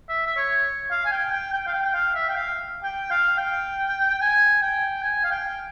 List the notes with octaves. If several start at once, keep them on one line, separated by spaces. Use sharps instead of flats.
E5
E5
C#5
F5
G#5
G5
G5
G5
F5
G5
G5
F5
E5
G5
F5
G5
F5
G5
G#5
G5
G#5
F5
G5